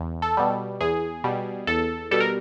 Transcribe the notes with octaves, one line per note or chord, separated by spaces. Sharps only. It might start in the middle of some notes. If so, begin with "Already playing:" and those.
Already playing: E2
A4
B2 G3
E2 G#4
B2 G3
E2 A4
B2 G3 A4
A#4